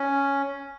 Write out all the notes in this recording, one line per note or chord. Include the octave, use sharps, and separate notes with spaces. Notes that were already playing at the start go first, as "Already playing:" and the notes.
Already playing: C#4